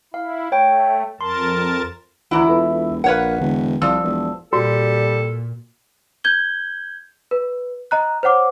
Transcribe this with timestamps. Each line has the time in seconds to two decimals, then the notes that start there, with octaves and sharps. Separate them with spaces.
0.14 E4 F5
0.52 A3 C#5 G5
1.21 F2 A#4 A5 C6
2.31 D2 E3 E4 F#5 A#5
2.48 E1 F4 A4 B4
3.04 A#1 A#4 B4 C#5 F5 F#5
3.41 E1 D3
3.82 C2 F3 D5 E6
4.03 E1
4.53 A#2 G3 F#4 A4
6.24 G6 G#6 G7
7.31 B4
7.91 D#5 A#5 F#6
8.23 C5 C#5 F#5 D6